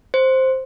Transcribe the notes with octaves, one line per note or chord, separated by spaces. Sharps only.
C5